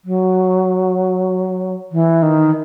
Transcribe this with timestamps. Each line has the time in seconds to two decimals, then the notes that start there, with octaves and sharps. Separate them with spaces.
0.05 F#3
1.92 E3
2.23 D#3